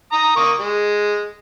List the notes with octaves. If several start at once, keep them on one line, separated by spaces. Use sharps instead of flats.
A#5 D#6
A#3 C#6 D#6
G#3